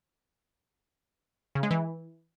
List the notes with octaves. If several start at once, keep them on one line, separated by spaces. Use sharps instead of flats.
C#3
G#3
E3